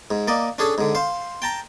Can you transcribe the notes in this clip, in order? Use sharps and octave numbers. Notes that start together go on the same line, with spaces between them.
G#2
A#3 D5 D#5
C#4 D4 G#4 A4
G#2 D3
C5 F5
G5 A5 A#5